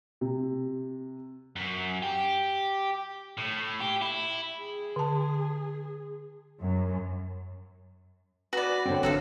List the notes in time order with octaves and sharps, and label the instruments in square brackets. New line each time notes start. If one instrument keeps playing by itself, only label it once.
[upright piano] C3
[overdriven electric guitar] F#2
G4
A2
G4
E4
[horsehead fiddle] G#4
[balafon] D3 A5
[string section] F#2
[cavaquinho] F#4 D5 [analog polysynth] B4
[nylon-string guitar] D3 C#5 G5 [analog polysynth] C4
[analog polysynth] A1 [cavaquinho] F#4 A4 F5